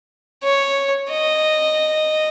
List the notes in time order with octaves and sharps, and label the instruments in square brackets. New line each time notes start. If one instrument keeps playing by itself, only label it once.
[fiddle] C#5
D#5